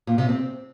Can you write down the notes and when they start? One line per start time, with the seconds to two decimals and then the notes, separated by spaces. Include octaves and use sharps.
0.07 A#2
0.18 C3
0.29 C4